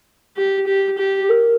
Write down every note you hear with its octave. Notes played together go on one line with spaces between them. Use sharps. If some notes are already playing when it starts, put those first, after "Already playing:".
G4
G4
G4
G4
A#4